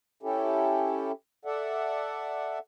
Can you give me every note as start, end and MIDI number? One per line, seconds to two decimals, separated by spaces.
0.23 1.12 61
0.23 1.12 64
0.23 1.12 67
0.23 1.12 69
1.45 2.59 69
1.45 2.59 74
1.45 2.59 76
1.45 2.59 78